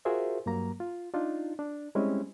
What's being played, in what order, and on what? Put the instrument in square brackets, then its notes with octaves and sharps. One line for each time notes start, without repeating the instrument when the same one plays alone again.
[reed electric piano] F4 F#4 G#4 A#4 C5 E5
G2 F#3 A#3 A#5
F4
D4 D#4 F4
D4
G3 G#3 C4 C#4 E4